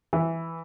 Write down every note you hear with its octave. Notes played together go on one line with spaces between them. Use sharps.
E3